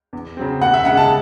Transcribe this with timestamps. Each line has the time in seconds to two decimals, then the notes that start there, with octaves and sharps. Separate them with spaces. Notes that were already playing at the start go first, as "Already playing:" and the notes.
0.13 E2
0.37 C#3 F#3 C4
0.61 D#2 F#5
0.74 E5
0.85 C#3 F#5
0.88 G#3
0.97 A5